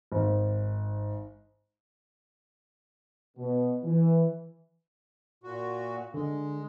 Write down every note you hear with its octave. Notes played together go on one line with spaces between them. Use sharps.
G#1
B2
E3
A#2 F#4
D3 G#3